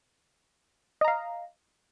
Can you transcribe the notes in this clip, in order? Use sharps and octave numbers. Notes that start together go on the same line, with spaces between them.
D#5 F5 A#5